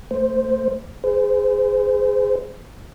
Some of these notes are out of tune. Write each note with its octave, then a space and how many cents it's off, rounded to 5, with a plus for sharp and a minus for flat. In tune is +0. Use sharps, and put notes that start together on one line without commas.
A3 +30 C5 +0
G#4 +0 C5 -30